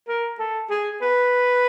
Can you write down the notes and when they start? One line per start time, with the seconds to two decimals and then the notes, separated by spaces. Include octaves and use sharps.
0.08 A#4
0.39 A4
0.70 G#4
1.01 B4